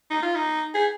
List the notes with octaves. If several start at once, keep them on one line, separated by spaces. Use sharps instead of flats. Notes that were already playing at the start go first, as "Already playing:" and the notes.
D#4
F4
D#4
G#4